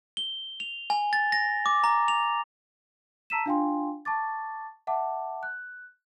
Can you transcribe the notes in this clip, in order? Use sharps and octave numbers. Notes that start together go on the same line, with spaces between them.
G7
F7
G#5
A6
A#6
D6
A#5
F7
A5 A#5 E6 B6 D#7 E7
D4 F4 F5 G5 G#5 C6
A5 C#6 D6 A6
E5 F#5 A5 D6
F#6